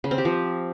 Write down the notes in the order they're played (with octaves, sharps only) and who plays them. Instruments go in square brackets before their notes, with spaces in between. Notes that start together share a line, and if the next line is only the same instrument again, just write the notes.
[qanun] C#3
C4
G4
F3